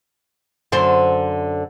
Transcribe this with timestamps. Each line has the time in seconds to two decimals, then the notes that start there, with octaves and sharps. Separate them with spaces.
0.72 F#2 D3 C5